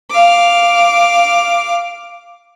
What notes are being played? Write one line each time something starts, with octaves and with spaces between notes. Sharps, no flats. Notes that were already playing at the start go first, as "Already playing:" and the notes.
F5 D6